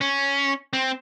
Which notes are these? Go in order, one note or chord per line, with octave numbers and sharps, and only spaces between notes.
C#4
C4